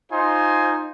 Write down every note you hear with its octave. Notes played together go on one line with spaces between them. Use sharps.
D#4 F4 C5 G#5 C6